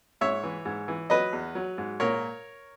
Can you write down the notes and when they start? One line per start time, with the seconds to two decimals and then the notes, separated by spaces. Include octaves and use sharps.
0.21 G#2 C#5 E5
0.43 E3
0.65 G#2
0.88 E3
1.10 F#3 B4 D#5
1.33 E2
1.55 F#3
1.78 G#2
2.00 A#2 A#4 C#5